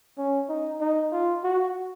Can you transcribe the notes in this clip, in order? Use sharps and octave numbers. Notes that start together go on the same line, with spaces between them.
C#4
D#4
D#4
F4
F#4